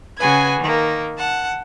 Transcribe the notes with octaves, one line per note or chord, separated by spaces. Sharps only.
C#3 F#4 G#4 B4 G#5 G#6
D#3 A#3
F#5 A5